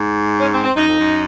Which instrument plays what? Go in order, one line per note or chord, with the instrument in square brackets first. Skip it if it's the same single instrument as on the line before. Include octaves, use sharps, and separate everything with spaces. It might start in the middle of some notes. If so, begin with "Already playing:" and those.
Already playing: [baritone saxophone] G#2
[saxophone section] C#4
C4
C4
[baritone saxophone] F#2 [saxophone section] D#4
[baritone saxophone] F2
F#2